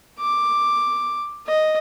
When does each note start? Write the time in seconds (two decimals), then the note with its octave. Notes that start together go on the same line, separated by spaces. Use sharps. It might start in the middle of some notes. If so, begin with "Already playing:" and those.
0.19 D6
1.47 D#5